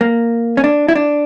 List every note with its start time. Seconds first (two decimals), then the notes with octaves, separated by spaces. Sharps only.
0.01 A#3
0.57 C#4
0.64 D4
0.88 E4
0.95 D4